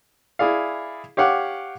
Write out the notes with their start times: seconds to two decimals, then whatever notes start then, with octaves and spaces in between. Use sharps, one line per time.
0.39 E4 G#4 D5 F5
1.17 G4 C#5 F5 F#5 D6